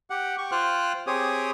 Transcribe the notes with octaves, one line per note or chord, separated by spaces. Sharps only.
G4 F#5
G4 C#6
F4 C5 G5 F6 F#6
C4 G4 G#4 C#5 D#6